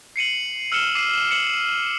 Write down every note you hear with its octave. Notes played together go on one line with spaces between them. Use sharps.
C7 C#7 D#7 F#7
E6 F6 C#7 E7 G7
D6 C7 D#7
C#7 F#7